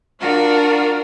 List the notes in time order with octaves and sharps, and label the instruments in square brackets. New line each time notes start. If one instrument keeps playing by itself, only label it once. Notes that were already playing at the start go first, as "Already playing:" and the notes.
[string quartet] D4 F4 F#4 A#4